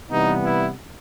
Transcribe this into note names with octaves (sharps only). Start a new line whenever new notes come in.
C3 E3 G3 B3 D#4
E4